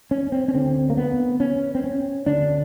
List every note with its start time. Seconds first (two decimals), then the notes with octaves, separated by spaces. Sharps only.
0.11 C#4
0.32 C4
0.48 C#4
0.54 D2 D3 C4
0.90 A#3
0.97 B3
1.40 C#4
1.75 C4
1.84 C#4
2.26 D2 D3 D4